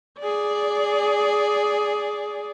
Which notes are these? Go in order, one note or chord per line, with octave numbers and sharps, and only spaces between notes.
G#4 D5